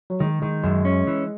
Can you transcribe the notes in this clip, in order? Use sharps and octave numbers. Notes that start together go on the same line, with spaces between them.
F#3
D#3 G#3
D#3 G#3
F#2 G#3
C#4
E3